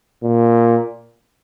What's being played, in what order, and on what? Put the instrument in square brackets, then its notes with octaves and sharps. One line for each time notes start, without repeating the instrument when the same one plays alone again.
[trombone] A#2